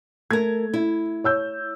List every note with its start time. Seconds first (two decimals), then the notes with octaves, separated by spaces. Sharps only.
0.31 A3 A#4 G#6
0.74 E4
1.24 C#5 E6 G6